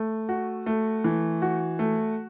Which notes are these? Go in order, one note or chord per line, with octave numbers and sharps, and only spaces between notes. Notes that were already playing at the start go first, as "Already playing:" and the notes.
Already playing: A3
F#4
A3
E3
F#4
A3